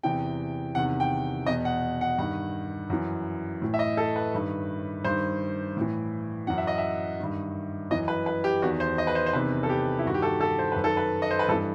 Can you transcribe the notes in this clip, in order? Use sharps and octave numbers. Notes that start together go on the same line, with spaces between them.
E2 C3 E3 G5
E2 C3 D#3 F#5
G5
E2 B2 D#5
F#5
F#5
G2 D#3 F#5
F#2 E3
A2 E3
E5
D#5
A4
B4
G2 D#3
G2 D#3 C5
A2 E3
F#2 E3 F#5
E5
D#5
E5
G2 D#3
F#2 E3 D#5
B4
B4
G4
E2 D#3 F#4
C5
D#5
B4
C5
C5
E2 C3 D#3 B4
A4
G4
E4
G2 D#3 F#4
G4
A4
A4
C5
F#2 B4
D#3 A4
B4
D#5
C5
B4
G2 E3 A4